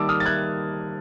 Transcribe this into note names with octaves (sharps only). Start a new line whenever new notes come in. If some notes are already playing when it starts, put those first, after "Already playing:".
Already playing: D#3 G3 A#3 A5 D6 E6
D#6 F6
A6
F#6 G#6